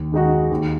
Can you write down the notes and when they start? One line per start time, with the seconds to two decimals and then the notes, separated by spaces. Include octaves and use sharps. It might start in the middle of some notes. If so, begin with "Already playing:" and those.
Already playing: D#2
0.12 D#3 G#3 D#4 F#4
0.51 D#2